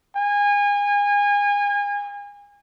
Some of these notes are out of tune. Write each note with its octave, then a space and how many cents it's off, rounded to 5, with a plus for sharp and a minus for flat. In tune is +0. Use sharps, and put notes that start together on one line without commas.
G#5 -30